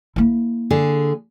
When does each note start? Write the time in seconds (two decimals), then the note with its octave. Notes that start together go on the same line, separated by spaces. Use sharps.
0.16 A#3 E4
0.71 D3 G#4